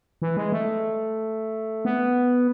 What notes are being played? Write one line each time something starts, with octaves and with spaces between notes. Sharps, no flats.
E3
G#3
A3
B3